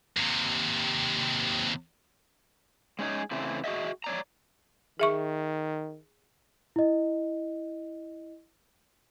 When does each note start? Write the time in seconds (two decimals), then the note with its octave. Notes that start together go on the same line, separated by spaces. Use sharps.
0.17 D#2 C3
2.99 G#3 C#4 D#4 G#4
3.31 C#3 E3 A3 C4
3.64 F#4 G#4 D#5 E5
4.04 C#5 D5 A#5
5.00 D#3 G#4 E5 C#6
6.76 E4 D#5